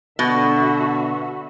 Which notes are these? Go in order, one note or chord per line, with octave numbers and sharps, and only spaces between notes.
B2 D3 F#4 E5